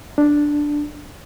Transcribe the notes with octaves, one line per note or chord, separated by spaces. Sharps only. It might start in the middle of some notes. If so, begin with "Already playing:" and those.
D4